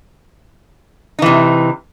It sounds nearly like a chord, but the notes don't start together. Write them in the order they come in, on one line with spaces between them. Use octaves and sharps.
D#4 E3 C3